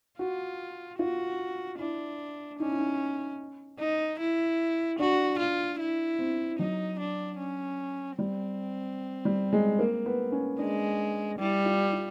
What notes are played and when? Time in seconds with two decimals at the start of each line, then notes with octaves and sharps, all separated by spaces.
0.19 F4 F#4
0.99 F4 F#4
1.79 D4 E4
2.60 C#4 D#4
2.69 E4
2.79 D#4
3.80 D#4
4.19 E4
4.99 D4 F#4
5.39 F4
5.80 E4
6.19 C4
6.59 F#3 D#4
6.99 D4
7.39 C#4
8.19 G3 C4
9.25 G3
9.53 G#3
9.79 A#3
10.06 B3
10.32 C#4
10.59 G#3 D4
11.39 G3 E4
11.65 F4
11.93 F4